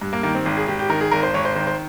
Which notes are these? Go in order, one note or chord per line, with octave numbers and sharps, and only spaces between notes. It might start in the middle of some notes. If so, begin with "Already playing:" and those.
G2
A#3
D#3 A#3
C4
G#1
G#4
G#1 G4
G4
D#3 A#4
G#4
G#1 A#4
C5
G#1 C#5
C5
D#3 C5
C5